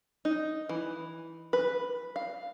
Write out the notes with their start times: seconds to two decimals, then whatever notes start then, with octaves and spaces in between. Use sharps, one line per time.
0.25 D#4
0.69 E3
1.53 B4
2.16 F5